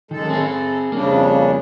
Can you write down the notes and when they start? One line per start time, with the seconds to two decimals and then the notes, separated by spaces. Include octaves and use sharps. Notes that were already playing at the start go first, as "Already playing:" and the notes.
0.11 F#2 D#3 G#3 A4
0.30 C4 G#4
0.44 A4
0.92 F2 C#3 G3 A#3 D4